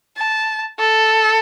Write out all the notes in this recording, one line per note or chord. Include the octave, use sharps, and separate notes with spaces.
A5
A4